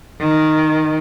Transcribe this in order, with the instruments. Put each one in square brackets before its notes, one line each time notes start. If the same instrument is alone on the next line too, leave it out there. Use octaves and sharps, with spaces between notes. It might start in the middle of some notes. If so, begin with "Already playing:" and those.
[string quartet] D#3